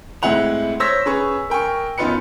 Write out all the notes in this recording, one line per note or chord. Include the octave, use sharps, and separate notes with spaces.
A2 G#3 C4 E4 F#5 F7
C5 C#5 E6 A#6 B6
C#4 G#4 B4 C#6
A#4 G5 G#5 C#6
F#2 B3 D#4 F4 B4 C#7